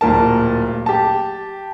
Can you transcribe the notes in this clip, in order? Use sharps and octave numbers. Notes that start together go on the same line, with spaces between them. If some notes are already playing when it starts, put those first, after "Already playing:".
D1 A#2 A#4 A5
G4 A5